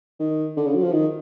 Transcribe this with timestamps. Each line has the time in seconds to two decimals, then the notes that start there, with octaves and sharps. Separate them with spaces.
0.19 D#3
0.57 D3
0.66 C#3
0.75 F#3
0.83 F3
0.93 D#3